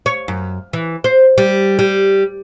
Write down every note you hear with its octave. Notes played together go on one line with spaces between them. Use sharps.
C#5
F#2
E3
C5
G3
G3